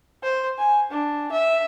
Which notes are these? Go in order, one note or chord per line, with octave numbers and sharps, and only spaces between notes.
C5
G#5
D4
E5